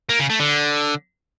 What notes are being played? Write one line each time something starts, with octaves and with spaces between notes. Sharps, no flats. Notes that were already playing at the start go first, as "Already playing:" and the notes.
A#3
C#3
A3
D3